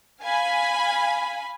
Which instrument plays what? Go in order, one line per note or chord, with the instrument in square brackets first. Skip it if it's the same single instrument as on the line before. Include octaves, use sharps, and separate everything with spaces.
[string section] F5 G#5 B5